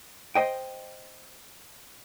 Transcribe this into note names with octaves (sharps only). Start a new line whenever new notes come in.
C5 D#5 G5